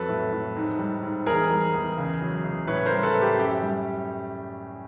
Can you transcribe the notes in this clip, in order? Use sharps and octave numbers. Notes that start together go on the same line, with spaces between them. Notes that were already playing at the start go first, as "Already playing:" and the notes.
Already playing: F2 F#3 A4 B4
A2
A2
G#2
G3
G#2
E2 G#4 A#4
G3
E2
C#2
F#3
C#2
A2 B4 C#5
A#4 C5
G3
A4 B4
A2
G4
F#2 G4
G3